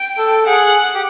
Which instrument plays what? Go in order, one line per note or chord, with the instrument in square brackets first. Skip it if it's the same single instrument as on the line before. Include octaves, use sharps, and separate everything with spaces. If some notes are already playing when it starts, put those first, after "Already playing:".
Already playing: [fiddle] G5
[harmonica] A4
[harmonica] G#4 [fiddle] F#5
[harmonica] G4